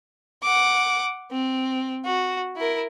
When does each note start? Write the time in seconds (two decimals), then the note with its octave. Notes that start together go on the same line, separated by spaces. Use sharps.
0.43 F#5 D6
1.31 C4
2.05 F#4
2.56 E4 A#4